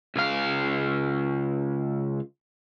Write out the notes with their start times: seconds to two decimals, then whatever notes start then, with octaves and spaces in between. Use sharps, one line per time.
0.16 C#2 F5